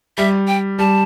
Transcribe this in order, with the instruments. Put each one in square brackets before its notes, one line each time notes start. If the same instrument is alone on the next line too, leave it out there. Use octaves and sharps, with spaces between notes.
[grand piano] G3 [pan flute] E5
[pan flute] G5
[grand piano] G3 [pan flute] A5